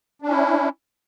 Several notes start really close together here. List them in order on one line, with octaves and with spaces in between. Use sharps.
D4 C#4 E4